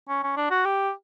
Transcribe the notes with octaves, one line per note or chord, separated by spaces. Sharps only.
C#4
C#4
D4
F#4
G4